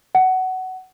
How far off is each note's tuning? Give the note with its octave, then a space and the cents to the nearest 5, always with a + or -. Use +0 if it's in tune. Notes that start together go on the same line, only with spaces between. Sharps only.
F#5 +15